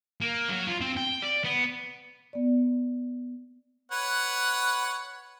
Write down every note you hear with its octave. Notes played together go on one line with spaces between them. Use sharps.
A#3
F#3
F4
C4
G5
D5
B3
B3 D5
B4 C#5 F#5